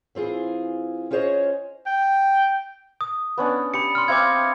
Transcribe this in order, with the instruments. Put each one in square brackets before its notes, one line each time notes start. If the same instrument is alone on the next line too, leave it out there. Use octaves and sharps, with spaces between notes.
[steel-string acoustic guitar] E3 C4 F4 G#4
C#4 F4 G#4 C5 C#5 D#5
[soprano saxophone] G5
[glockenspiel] D#6
[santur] B3 C#4 D4
[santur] G4 [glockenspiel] B5 C#7
[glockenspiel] C6 F6
[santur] C4 E5 F5 [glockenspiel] D6 G#6